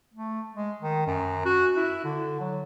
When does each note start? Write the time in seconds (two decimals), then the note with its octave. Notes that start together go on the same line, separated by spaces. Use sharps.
0.14 A3
0.55 G#3
0.82 D#3
1.06 F#2
1.45 F#4
1.77 E4
2.04 D3
2.40 F#3